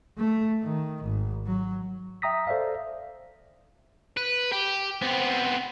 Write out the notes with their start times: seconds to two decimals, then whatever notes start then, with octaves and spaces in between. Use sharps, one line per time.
0.18 A3
0.63 D#3
1.04 G#1
1.46 F#3
2.22 E5 G5 A#5 D#6 A#6 B6
2.47 A4 C5 D5 E5 F5
4.17 B4
4.52 G4
5.02 B3 C4